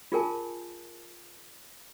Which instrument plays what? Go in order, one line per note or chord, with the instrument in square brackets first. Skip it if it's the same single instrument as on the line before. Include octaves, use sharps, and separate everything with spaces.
[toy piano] F4 G#4 A#4 G#5 A5